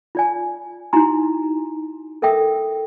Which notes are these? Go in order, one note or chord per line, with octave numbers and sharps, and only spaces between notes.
F4 D5 G#5
D#4 E4 F#4 G#5 A#5 C6
A4 A#4 E5 G5 D#6